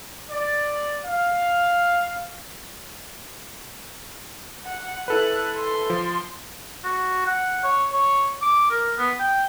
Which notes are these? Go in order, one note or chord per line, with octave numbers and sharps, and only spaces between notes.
D5
F5
F#5
E4 A4 B4 F#6
C6
F3
F#4
F#5
C#5
C#5
D6
A#4
B3
G5